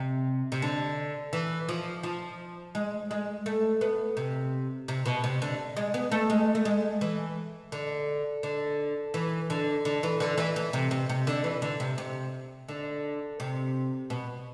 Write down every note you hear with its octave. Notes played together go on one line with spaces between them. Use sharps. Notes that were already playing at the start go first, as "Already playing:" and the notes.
Already playing: C3
C3
D3
E3
F3
F3
G#3
G#3
A3
B3
C3
C3
B2
C3
D3
G#3
B3
A3
G#3
A3
G#3
E3
D3
D3
E3
D3
D3
E3
D3
E3
E3
C3
C3
C3
D3
E3
D3
C3
C3
D3
C3
B2